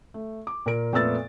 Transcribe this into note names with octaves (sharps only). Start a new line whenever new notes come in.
A3
D6
A#2 A#4 D7
F2 A#2 A3 B3 E6 A6